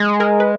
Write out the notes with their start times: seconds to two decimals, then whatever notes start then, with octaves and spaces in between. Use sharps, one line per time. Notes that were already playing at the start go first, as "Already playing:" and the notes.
Already playing: G#3
0.20 G#4 A#4
0.40 B4